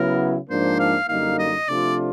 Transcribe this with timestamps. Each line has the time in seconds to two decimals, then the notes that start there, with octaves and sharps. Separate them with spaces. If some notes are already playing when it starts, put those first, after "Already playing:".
Already playing: C#3 F#3 B3 E4 A#4
0.50 G#2 F3 A#3 D4 C5
0.79 F5
1.08 F#2 D3 G3 A#3 D#4 F5
1.39 D#5
1.68 C3 F3 A3 D4 F4 D5